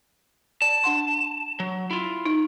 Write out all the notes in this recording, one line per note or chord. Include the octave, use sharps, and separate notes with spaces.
D5 A5
D4 F#5 C6
F#3
E4 F4
D#4